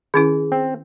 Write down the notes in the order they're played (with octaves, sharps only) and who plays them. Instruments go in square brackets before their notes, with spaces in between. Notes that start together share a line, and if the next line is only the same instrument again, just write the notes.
[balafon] D#3 C#4 E4 [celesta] G#4
[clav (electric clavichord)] C4